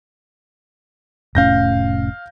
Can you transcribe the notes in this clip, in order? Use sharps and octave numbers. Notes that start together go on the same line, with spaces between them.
F1 A2 C#4 F5 G6 A#6